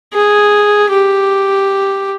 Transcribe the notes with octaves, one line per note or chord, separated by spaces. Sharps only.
G#4
G4